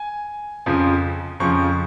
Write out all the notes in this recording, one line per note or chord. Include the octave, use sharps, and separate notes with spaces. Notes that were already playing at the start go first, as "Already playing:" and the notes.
Already playing: G#5
F2 C#3 F3
F2 C#3 F3 C#6